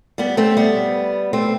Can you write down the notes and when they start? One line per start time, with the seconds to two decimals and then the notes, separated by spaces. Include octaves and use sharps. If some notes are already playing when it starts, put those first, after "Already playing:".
0.18 G3 B3
0.37 A3 C4
0.57 G3 B3
1.33 A3 C4